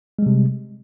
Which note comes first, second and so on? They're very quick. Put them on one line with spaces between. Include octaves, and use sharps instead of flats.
G#3 G3 C3